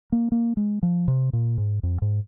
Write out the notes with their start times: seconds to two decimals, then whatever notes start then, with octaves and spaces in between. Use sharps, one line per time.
0.12 A#3
0.32 A#3
0.57 G#3
0.83 F3
1.08 C3
1.33 A#2
1.58 G#2
1.83 F2
2.02 G#2